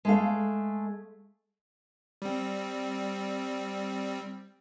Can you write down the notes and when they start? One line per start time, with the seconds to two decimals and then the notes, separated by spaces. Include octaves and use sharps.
0.05 G#3 A3 F5
2.22 G3 C4